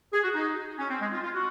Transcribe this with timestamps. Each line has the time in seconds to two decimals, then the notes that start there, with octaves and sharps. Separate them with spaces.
0.13 G#4
0.24 F#4
0.35 D#4
0.79 C#4
0.90 C4
1.01 G#3
1.12 F4
1.23 F4
1.34 F#4